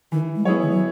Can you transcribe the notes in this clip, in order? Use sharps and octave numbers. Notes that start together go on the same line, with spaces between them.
D#3 E3
G#3
F#3 B3 E4 G#4 C#5
D#3
F#3